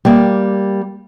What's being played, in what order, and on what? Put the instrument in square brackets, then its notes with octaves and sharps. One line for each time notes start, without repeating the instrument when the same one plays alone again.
[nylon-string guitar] G3 A#3